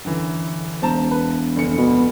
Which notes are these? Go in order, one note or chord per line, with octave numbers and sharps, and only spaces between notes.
F#2 D3 E3
E1 C5 A5 A#5
B4
F1 D2 C#7
B2